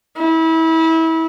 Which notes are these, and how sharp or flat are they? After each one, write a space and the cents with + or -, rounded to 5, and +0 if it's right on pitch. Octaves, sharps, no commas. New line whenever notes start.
E4 -30